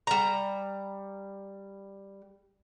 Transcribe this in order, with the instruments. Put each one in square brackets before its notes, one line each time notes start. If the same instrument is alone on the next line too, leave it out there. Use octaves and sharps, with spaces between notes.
[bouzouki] G3 A#5